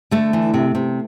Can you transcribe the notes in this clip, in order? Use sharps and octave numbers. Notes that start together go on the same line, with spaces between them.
D3 A3
E3
C3
C3